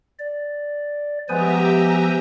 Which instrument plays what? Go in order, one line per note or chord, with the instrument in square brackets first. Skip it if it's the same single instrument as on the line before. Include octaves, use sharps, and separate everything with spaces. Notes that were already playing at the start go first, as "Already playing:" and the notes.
[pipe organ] D5
[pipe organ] F3 C5 G#5 [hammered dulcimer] G#3 B3 [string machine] G4 E5 A#5